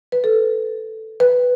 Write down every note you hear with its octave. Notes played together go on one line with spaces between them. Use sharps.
B4
A4
B4